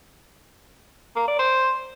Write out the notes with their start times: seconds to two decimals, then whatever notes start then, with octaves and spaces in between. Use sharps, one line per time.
1.16 A#3
1.28 D5
1.39 C5